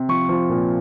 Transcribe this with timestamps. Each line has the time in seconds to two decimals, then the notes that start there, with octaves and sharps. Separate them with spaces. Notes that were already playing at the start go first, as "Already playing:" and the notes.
Already playing: C3
0.09 F3 C#6
0.29 F3
0.49 A#2